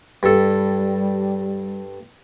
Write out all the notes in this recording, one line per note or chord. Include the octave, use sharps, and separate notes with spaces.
G2 G3 A4